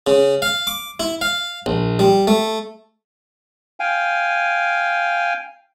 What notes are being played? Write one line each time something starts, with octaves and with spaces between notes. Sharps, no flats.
C#3
F5
D6
E4
F5
A#1
G3
A3
F5 G5 G#5